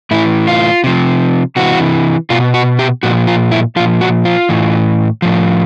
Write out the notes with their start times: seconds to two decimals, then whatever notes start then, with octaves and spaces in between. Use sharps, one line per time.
0.11 A2 E3 E4
0.47 F4
0.84 C3 F3
1.56 C3 E3 F#4
2.30 B2 F4
2.54 F#4
2.79 G4
3.03 A#2 F3 F#4
3.27 F4
3.52 E4
3.76 F3 F4
3.79 A#2
4.01 F#4
4.25 F4
4.49 A2 E3
5.22 A2 F3